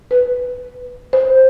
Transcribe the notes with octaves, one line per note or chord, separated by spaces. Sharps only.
B4
C5